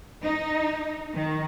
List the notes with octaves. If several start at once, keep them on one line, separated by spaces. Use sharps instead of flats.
D#4
D#3